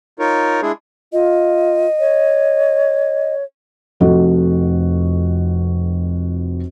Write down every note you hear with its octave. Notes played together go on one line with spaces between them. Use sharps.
D#4 F4 A#4 C#5
G#3 D4 E4 G#4
F4 D#5
C#5
F1 F2 F#4 A4 D#5